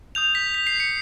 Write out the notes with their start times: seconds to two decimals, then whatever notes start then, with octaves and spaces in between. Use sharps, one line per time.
0.15 D#6 G6 F7
0.35 B6
0.54 B6
0.67 C7
0.80 C#7